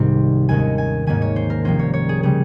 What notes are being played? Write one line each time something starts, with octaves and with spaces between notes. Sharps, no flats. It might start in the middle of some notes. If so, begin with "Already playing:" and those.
Already playing: C2 G#2 C3 D#3 G3 C4
D#2 D#3 G#3 C#4 G#5
G#5
G#2 D#3 A#3 C#4 G#5
C#5
C5
A#4
C2 C3 F3 A#3 C#4 C5
C#5
C#5
G#4
C#3 G3 G#4